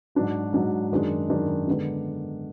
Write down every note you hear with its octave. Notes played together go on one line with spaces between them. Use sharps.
G#2 F#3 D4 F#4
G#2 F#3 D4 F#4
F#2 D#3 G#3 D4
F#2 D#3 G#3 D4
D3 G#3 B3 D4